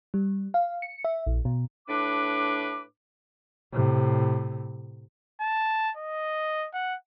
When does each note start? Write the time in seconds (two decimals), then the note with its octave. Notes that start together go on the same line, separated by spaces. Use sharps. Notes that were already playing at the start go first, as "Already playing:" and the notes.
0.14 G3
0.54 F5
0.82 C#7
1.04 E5
1.26 A#1
1.45 B2
1.88 A2 D4 B4 D6
3.73 A2 C3
5.41 A5
5.97 D#5
6.74 F#5